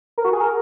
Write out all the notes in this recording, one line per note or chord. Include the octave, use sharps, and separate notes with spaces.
A#4
F#4
G#4
A#4